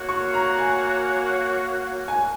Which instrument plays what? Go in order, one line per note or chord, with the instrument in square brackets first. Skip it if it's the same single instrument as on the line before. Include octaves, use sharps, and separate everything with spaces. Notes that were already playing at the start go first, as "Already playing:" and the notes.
Already playing: [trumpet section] A#3 F#4 C#5 F#5
[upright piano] C#6
A#5
G#5
G#5